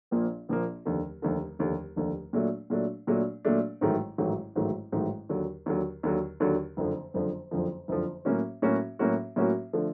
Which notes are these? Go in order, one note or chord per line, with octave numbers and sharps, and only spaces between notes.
A#1 A#2 F3 A#3
A#1 A#2 F3 A#3
F1 D#2 D3
F1 D#2 D3
F1 D#2 D3
F1 D#2 D3
A#2 F#3 A3 D4
A#2 F#3 A3 D4
A#2 F#3 A3 D4
A#2 F#3 A3 D4
A1 G#2 D#3 F#3 A3
A1 G#2 D#3 F#3 A3
A1 G#2 D#3 F#3 A3
A1 G#2 D#3 F#3 A3
D#2 D3 F#3
D#2 D3 F#3
D#2 D3 F#3
D#2 D3 F#3
F#1 F2 D3 F3
F#1 F2 D3 F3
F#1 F2 D3 F3
F#1 F2 D3 F3
A2 F#3 A#3 C#4 F#4
A2 F#3 A#3 C#4 F#4
A2 F#3 A#3 C#4 F#4
A2 F#3 A#3 C#4 F#4
D3 F3 A3